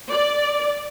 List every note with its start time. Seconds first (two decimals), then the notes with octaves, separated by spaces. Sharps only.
0.11 D5